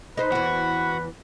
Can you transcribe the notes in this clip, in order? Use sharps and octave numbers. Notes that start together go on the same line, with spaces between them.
D#4 B4 C5
E2 E3 F#4